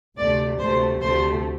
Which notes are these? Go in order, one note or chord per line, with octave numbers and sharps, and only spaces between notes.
D2 C3 A3 D5
D2 C3 A3 C5
D2 C3 A3 C5